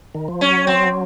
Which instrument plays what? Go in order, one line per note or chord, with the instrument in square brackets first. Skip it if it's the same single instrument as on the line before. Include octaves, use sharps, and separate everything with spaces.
[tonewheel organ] D#3
F3
[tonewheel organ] F#3 [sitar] C#4
[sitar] C4